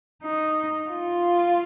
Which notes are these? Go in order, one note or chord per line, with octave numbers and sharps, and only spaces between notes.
D#4
F4